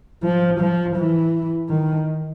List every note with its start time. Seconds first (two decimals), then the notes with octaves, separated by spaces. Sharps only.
0.24 F3
0.60 F3
0.96 E3
1.69 D#3